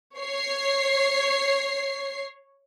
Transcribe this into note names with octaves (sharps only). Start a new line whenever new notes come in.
C#5 C7